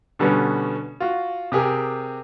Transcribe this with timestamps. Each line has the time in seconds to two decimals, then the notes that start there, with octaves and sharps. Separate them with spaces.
0.19 B2 D3 G3 B3 C#4
1.00 F4 F#4
1.52 C3 G4 G#4 A#4